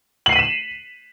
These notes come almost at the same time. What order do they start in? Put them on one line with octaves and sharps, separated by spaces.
F#7 C7 D#7 B6 E7